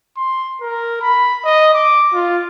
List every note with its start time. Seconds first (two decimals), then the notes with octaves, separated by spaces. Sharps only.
0.17 C6
0.61 A#4
1.02 B5
1.44 D#5
1.74 D6
2.13 F4